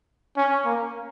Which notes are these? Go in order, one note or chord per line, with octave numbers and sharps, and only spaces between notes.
C#4
A#3